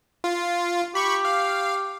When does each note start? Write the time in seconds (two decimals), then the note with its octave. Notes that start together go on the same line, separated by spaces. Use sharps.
0.24 F4
0.95 G4 B5 C#6
1.25 F5